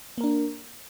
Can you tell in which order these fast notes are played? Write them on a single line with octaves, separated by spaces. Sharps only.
A#3 A#4 D4